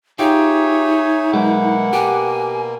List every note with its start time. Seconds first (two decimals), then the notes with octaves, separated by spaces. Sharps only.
0.19 D#4 F4 G4 G#4 C#5 E5
1.33 B2 F#3 G#3 A#3 E4 F#5
1.93 G4 G#5